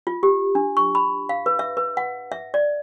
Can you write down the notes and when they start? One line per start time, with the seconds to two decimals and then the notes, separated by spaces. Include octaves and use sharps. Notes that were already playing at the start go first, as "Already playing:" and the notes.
0.07 F4
0.23 G4
0.55 D4
0.77 C#6
0.95 B5
1.29 F5
1.46 B4
1.59 E5
1.77 B4
1.97 F#5
2.32 E5
2.54 D5